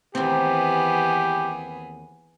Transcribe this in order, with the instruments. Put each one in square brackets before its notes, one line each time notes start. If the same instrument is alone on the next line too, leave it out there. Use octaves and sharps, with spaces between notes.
[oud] D#2 C4 [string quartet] E3 B3 G#4 [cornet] G4